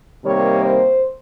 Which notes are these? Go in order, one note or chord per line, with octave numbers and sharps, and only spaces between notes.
C3 D#3 G3 A#3 C#5
C5